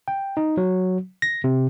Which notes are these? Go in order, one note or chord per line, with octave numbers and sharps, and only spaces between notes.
G5
D#4
F#3
A#6
C3